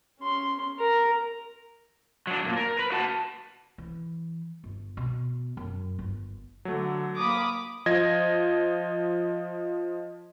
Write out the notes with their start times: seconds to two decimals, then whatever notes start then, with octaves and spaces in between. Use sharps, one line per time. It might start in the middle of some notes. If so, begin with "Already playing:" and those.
0.20 C#4 C6
0.79 A#4 A#5
2.27 F#3 D4
2.45 G2 A#2
2.56 A#4
2.79 B4
2.92 F#4 F#5 A5
3.78 E3
4.64 G1
4.97 B2
5.57 F#2
5.99 G1
6.65 D3 F#3 A3
7.17 A#3 B5 D6 D#6
7.86 F3 D#5 G#6 A#6